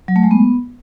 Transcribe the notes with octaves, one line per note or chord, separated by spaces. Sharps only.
F#3
A3
G#3
B3